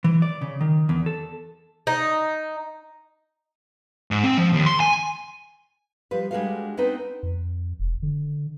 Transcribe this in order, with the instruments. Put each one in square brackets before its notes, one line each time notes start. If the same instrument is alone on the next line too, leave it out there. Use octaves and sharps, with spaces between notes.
[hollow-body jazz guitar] E3
D5
C#3
D#3
E2
A4
[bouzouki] D#4
[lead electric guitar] G#2
C4
F3
D#2
C6
G#5
[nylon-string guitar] F3 G3 B4
G3 G#3 D4 F#4 A4 F5
B3 C4 D4 D#4 B4
[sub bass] F2
E1
D3